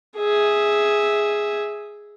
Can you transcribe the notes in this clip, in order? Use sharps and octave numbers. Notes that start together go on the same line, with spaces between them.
G#4 E5